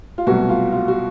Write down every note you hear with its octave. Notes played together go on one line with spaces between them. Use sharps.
F4
C2 B2 F#3 A3 F#4
F4
F4
F#4